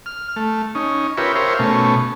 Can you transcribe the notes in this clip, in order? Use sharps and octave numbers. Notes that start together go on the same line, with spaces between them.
F6
A3
C#4 D#4
F4 G4 A#4 B4 C#5 E5
G4 A#4 C5 C#5 E5 F5
B2 A3 C#4